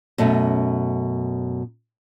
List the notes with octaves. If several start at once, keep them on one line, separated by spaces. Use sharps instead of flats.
F#2 B2 A3 C#4